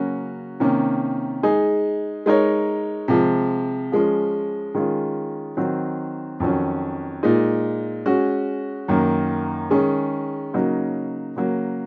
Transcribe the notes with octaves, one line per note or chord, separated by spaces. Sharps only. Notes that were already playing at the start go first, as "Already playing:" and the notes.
Already playing: C#3 F#3 A#3 C#4 F#4
C3 D#3 A#3 C#4
G#3 D#4 G#4
G#3 D#4 A#4 C#5
C3 F3 G#3
F3 G#3 C#4
D#3 G#3 C#4 F4
D#3 F#3 C4 D#4
F2 D#3 F#3 C#4
A#2 G#3 D#4
G#3 C#4 F#4
F#2 D#3 A#3
D#3 G#3 C#4 G#4
C#3 F#3 A#3 D#4
C#3 F#3 A#3